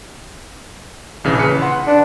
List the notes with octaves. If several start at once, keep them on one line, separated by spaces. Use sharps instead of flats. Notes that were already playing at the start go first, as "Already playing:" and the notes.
A#1 C#3 E3
B4 C#7
F#5 C6
D4